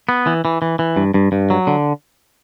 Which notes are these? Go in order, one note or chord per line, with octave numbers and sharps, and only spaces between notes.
B3
E3
E3
E3
E3
G2
G2
G2
F#3
D3